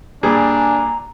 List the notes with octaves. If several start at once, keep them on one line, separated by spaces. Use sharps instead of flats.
A#2 G3 D4 G#4 G#5 A#5